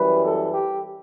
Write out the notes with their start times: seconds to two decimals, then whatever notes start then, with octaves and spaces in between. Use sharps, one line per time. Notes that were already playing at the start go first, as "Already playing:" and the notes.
Already playing: F#2 E3 G3 B4
0.25 A4
0.54 G4